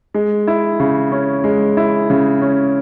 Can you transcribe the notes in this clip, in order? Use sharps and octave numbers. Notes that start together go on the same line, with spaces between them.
G#3
E4
C#3
C#4
G#3
E4
C#3
C#4